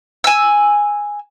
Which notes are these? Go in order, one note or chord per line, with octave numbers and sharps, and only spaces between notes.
G#5 E6